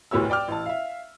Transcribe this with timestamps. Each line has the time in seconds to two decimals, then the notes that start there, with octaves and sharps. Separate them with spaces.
0.11 F1 D2 A2 G4 C#5 E6
0.30 D5 G5 D6 F6
0.48 A1 A5
0.66 E5 F5